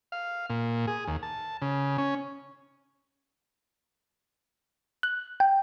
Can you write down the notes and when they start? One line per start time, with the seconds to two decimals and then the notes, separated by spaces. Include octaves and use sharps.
0.12 F5
0.50 A#2
0.87 G#4
1.07 D#2
1.23 A5
1.61 C#3
1.98 C#4
5.03 F#6
5.40 G5